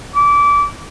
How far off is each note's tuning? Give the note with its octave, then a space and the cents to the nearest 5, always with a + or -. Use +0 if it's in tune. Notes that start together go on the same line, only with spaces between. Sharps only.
D6 -25